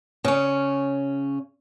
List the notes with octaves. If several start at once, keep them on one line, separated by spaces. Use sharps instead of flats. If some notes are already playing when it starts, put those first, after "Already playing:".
C#3 C#4